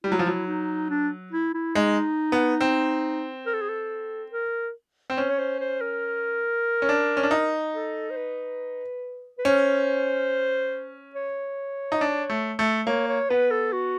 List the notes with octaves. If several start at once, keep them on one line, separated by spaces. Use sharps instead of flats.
G3 E4
F#3
F3
F#3
D#4
D4
E4
E4
G#3 D#4
B3
C4
A#4
A4
G#4
A4
A#4
C4
C#4 C5
C#5
C5
C5
A#4
C#4
D4
C#4
D4
D#4
A4
C5
B4
B4
C#4 C5
C#5
D#4
D4
A3
A3
A#3 C#5
C#5
B3 B4
A4
F#4